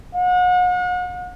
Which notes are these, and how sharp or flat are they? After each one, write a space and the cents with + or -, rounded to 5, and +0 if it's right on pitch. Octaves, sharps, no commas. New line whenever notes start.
F#5 -40